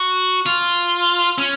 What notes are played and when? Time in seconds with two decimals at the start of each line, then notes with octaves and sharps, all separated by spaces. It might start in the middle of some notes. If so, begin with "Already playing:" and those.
Already playing: F#4
0.46 F4
1.38 C#4